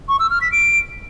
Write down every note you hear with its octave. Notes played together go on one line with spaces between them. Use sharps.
C#6
E6
F6
B6
D7